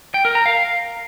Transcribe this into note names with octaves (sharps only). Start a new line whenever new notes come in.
G5
A#4
A#5
F5